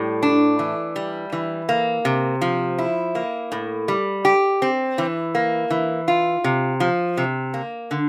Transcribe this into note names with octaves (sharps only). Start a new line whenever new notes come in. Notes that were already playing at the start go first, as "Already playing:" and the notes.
Already playing: A2 G3
D4
E3
G3
E3
A#3
C3
F3
E4
A#3
A2
G3
G4
C4
E3
A#3
E3
F4
C3
F3
C3
A#3
D3